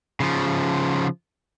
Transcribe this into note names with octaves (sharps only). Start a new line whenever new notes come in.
C#3 F3